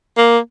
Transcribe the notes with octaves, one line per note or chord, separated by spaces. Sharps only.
A#3